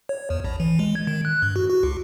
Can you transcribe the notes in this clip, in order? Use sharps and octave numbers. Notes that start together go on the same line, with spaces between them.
C#5
E2
A#1
E3
G#3
G#6
D#3
F#6
G2
F#4
F#4
C#2